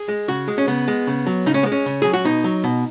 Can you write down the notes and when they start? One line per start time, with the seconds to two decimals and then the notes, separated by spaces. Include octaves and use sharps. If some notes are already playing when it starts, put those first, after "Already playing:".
Already playing: G#4
0.09 G#3
0.28 C#3 F#4
0.48 G#3
0.58 C#4
0.68 C#3 B3
0.88 G#3
1.07 C#3
1.27 F#3
1.46 C#3 D#4
1.54 C#4
1.63 B3
1.66 G#3
1.72 C#4
1.86 C#3
2.02 F#3 G#4
2.14 F#4
2.25 B2 D#4
2.44 F#3
2.64 B2